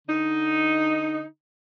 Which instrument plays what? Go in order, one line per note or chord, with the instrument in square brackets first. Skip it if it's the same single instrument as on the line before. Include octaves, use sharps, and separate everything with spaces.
[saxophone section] D3 D#4